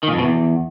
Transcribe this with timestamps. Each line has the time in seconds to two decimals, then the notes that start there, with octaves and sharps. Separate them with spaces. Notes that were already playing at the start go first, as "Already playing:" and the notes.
0.03 D#3
0.08 A#2
0.13 F2
0.18 B2
0.24 E2